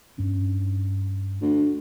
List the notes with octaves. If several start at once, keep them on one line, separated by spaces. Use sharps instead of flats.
G2 C#4 D4
D2